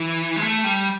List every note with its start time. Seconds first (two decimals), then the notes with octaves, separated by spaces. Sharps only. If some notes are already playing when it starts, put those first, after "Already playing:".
Already playing: E3
0.36 G#3
0.42 A3
0.64 G3